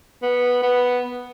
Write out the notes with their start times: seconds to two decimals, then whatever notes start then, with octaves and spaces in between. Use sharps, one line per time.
0.23 B3
0.63 B3